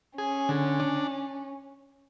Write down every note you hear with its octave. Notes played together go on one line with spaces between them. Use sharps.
C#4 G#4
D3
D4